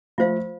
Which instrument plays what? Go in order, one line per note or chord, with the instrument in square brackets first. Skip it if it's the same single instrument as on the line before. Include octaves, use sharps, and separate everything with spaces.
[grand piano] F3 A3 [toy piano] F4 C5 F5